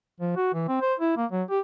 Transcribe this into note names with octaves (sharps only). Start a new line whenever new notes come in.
F3
F#4
E3
C4
C5
E4
A#3
F#3
G4